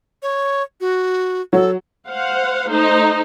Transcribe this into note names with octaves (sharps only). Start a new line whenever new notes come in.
C#5
F#4
F#3 A4
C5 F5 F#5
A3 D#4 C5